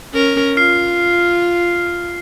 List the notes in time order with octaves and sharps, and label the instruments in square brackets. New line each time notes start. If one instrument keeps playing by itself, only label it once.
[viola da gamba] C#4 A#4
[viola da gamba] F4 [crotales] F6 C7